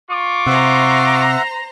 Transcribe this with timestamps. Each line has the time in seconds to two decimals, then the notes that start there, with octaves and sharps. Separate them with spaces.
0.11 F4 C#6 D6
0.46 C3 C5 E5 F#5 A#5